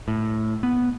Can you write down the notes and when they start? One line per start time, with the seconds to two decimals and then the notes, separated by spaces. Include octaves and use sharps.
0.08 A2
0.63 B3